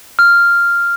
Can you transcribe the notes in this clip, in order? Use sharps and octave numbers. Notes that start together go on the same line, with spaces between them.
F6